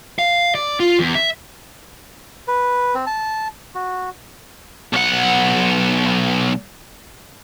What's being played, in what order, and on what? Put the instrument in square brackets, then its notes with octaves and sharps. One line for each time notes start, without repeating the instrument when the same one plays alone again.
[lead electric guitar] F5
D5
F4
E2
E5
[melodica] B4
C4
A5
F#4
[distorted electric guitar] B1 F#5